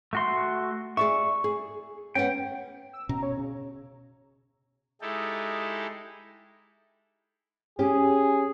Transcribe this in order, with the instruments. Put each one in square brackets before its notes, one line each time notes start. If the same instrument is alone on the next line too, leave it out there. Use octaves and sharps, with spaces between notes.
[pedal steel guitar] A3 F#4 C6
[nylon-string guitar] G#4 D5 E5 [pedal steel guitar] C#6
[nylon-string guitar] G#4
[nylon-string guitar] B3 C#4 [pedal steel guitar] G5
[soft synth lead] E6
[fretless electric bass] B2 C#4 [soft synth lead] A#5
[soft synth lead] C#5
C#3
[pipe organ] G#3 D#4 E4 G4 A4
[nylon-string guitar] C#4 G4 [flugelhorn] G#4